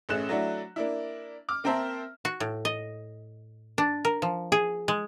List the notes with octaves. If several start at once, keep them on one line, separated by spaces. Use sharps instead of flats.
A1 A3 C#4 G#4 F#6 E7
F#3 A3 D4 E4 F#4
A#3 D4 E4
D6 F6
A#3 C4 A#4 C5 E5 A5
F#4
A2
D#5
D4
A#4
F3
G#4
G#3